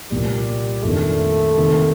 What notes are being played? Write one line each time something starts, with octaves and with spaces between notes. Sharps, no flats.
C2 A#2 F3 G3 A#3
F2 D#3 A3 A#3 D4
C3 D#3 A#3